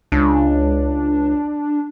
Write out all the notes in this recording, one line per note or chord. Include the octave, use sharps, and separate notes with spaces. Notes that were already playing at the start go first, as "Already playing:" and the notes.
C#2 D4